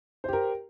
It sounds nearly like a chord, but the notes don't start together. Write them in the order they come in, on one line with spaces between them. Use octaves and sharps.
C5 G4 A#4